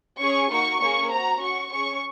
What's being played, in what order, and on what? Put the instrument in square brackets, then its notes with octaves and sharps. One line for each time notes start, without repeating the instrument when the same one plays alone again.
[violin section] C#4 G#4 C#6
A#3 D#4 F#4 C#6
A#3 C#4 G#4 C#6
C4 F#4 A#5
C#4 F#4 C#6
C#4 G#4 C#6